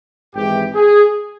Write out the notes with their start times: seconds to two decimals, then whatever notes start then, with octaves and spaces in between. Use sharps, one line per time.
0.35 G#1 G#2 E3 G4
0.75 G#4